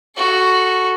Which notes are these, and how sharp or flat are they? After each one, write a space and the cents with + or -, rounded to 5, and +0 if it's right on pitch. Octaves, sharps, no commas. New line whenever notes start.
F#4 +0 A4 +0